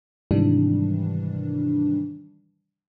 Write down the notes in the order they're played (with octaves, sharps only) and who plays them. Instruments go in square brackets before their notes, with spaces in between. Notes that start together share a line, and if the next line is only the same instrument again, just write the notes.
[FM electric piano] G#2 C3 D#3 E3 G3 D4